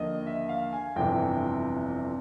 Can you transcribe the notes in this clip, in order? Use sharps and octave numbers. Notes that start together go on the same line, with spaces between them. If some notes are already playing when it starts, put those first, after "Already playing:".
Already playing: D#2 D3 F3 A#3 D#5
E5
F5
G#5
G1 F2 C3 E3 G5